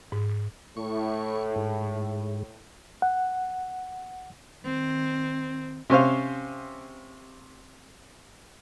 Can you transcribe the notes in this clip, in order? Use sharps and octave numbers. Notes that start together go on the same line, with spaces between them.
G#2
A2 C#6
G#2
F#5
D#3 C4
C3 C#4 C5 F5